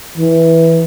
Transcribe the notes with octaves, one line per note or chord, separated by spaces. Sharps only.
E3